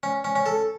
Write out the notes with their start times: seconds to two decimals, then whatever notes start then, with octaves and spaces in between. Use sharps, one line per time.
0.03 C#4
0.24 C#4
0.35 C#4
0.46 A4